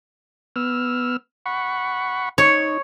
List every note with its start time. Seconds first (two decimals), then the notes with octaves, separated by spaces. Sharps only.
0.56 B3 E6 F6
1.46 F#5 B5 C#6
2.38 D#4 C#5